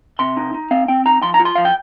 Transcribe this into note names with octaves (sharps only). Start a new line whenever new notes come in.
C3 C6
D#4
D#4
C4 F5
C4 G5
D#4 A#5
F3 C6
A#5
F4
C6
F3 F5
G5